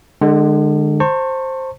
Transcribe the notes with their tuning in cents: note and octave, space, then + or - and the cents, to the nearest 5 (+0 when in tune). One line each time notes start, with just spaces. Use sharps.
D3 +35 G#3 +0
C5 +10 A5 +35 C#6 -15